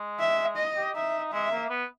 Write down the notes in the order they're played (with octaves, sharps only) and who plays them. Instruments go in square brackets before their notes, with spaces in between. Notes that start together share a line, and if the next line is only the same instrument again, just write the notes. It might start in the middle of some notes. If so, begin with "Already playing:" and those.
Already playing: [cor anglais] G#3
[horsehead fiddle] E5
D#5
[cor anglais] G4
[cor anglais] D#4 [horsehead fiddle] E5
[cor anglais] G#3 [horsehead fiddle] E5
[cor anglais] A#3
B3